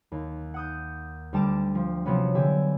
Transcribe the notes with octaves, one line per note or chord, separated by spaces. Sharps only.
D#2
F#5 D#6 G6
D2 G3 A5 D6 E7
F3
C3 F3 F#3 B3 C#4
D3 G4 E5 G#5